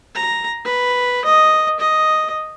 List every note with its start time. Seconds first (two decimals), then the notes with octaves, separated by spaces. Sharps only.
0.15 A#5
0.65 B4
1.25 D#5
1.80 D#5